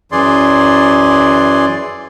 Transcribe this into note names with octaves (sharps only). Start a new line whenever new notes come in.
F#2 E3 G#4 D5 C6